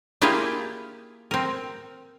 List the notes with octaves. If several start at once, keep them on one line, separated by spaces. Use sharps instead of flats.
A#3 E4 F4 G4 G#4 F5
C4 A#4